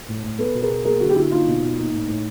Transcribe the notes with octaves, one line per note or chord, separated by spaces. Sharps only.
A2
A2
B3 A4 B4
B2
G#4 A#4
B2
A#3 G#4 A#4
D3 F#4 G#4
G4
D3 E4 F#4
A#3 D#4 F4
B2
B2
A#3 D#4
A2
A2